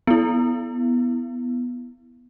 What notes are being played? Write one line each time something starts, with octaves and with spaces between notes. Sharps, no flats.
B3 E4